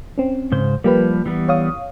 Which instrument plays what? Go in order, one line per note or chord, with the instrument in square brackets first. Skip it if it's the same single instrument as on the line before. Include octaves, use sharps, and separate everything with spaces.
[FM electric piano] C4 C#4
[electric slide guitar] G#2 C#3 C5
[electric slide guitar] F3 G3 [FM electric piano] A#3 G4 B4
[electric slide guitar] E3 G3 B3
[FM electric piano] C#5 F5 D#6